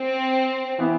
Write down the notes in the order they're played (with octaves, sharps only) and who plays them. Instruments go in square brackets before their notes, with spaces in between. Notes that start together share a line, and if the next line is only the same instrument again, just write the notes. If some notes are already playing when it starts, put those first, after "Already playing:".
Already playing: [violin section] C4
[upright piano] E3 B3 E4